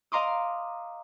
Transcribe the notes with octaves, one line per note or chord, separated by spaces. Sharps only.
D#5 F5 A#5 C6 D6 D#6